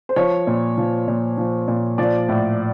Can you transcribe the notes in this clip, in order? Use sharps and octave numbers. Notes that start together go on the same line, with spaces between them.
C5
F3 C#5
A#2
F3
A#2
F3
A#2
F3 D5
A2